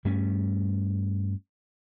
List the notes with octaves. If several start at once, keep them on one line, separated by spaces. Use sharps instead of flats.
G2 G3 A3 C#4